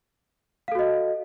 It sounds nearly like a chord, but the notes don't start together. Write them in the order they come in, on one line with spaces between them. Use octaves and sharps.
F5 A4 F#4 D#5